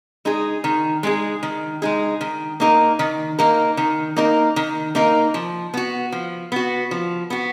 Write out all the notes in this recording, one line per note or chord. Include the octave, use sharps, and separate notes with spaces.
G#3 D#4 G#4
D#3
G#3 D#4 G#4
D#3
G#3 D#4 G#4
D#3
A#3 D#4 A#4
D#3
A#3 D#4 A#4
D#3
A#3 D#4 A#4
D#3
A#3 D#4 A#4
F3
B3 F#4
F3
B3 F#4
F3
B3 F#4